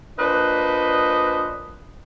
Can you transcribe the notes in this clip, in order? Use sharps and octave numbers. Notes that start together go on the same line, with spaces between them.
A#2 D4 B4 C5 D#5